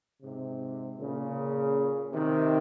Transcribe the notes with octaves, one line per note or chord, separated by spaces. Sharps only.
G#2 C3
A#2 C#3
C3 D#3